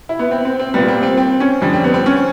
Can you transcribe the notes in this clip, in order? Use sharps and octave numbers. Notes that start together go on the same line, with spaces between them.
E4
B3
C4
C4
C4
A#2 G3 B3
C4
C4
C4
C#4
F2 D3 G3
C4
B3
C4
C#4